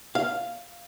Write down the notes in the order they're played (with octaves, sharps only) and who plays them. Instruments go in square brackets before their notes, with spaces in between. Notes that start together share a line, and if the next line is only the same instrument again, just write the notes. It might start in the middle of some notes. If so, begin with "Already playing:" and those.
[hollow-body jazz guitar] F5